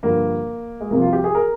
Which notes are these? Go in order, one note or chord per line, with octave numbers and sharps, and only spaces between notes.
G2 D3 F3 A#3
G#3
C2 C3 F3 A#3
F4
G4
G#4
A#4